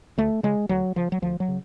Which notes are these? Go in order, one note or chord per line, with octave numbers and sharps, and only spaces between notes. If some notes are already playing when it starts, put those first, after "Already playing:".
D2 A3
C#3 G#3
D2 F#3
C#3 F3
F#3
D2 F3
F#3
C#3